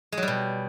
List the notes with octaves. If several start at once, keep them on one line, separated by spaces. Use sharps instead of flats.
G#3
F#3
G3
B2